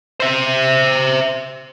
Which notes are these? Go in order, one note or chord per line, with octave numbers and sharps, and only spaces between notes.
C5 E5